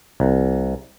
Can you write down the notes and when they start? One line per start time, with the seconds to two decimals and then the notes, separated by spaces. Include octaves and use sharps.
0.20 C2